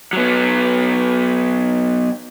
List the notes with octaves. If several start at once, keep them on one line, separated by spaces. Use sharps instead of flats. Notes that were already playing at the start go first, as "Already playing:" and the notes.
F#3 B3